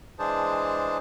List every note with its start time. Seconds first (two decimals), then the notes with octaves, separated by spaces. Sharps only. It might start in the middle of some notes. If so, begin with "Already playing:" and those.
0.19 E3 G#3 D4 G#4 C5 A5